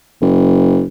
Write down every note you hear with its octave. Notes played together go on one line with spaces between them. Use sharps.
F#1